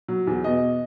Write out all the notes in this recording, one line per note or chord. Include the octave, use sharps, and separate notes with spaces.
F#3
E2
B2 D#5